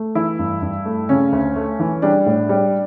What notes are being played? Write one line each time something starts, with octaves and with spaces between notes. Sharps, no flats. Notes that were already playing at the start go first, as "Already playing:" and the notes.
Already playing: A3
E3 E4
G2
G2
A3
C#3 C#4
D2
A3
E3
G3 D4
A2
G3